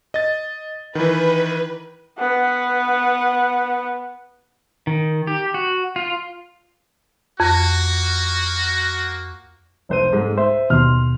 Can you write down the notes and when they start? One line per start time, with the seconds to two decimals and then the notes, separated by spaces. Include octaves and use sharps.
0.14 D#5 A6
0.95 D#3 E3 B4
2.18 B3 F#5
4.87 D#3
5.27 G4
5.54 F#4
5.96 F4
7.40 F2 A#3 F#4
9.89 F1 C5 D#7
10.13 G#2 G#3 A3
10.38 C5 E5
10.70 D#2 B2 C6 F6